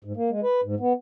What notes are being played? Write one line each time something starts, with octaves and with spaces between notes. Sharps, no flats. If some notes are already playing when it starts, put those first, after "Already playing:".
G#2
A#3
G#3
B4
G#2
B3